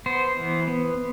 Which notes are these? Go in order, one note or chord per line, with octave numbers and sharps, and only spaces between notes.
B3 C5
E3
B3